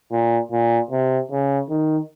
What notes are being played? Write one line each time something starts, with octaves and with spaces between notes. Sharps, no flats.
A#2
A#2
C3
C#3
D#3